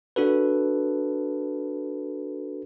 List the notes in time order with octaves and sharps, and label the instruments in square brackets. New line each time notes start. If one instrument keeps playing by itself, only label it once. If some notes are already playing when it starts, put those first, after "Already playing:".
[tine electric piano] D4 F#4 A4 B4